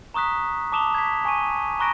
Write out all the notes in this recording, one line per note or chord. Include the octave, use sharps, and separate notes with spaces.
A#5 C#6 D#6 F#6 B6
A5 D6 D#6 E7 F7 G7
G#6 B6
G#5 C#6 D#7
A#5 B5 C#6 F#6 A#6 D7